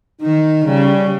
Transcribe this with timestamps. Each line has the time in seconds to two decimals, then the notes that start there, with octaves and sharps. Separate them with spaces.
0.21 D#3 D#4
0.64 C#3 G3